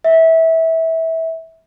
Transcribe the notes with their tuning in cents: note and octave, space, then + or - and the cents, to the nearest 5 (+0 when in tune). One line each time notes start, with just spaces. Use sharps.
E5 -20